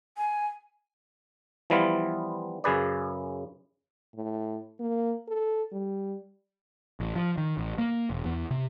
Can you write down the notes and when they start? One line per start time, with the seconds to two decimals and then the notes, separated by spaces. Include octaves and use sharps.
0.17 G#5
1.70 E3 F3 G3 B3 E4 F4
2.64 F#2 C#3 G#4 B4 D5
4.15 A2
4.80 A#3
5.28 A4
5.72 G3
7.00 A1
7.16 F3
7.38 D#3
7.58 A1
7.78 A#3
8.10 E1
8.26 E2
8.51 C3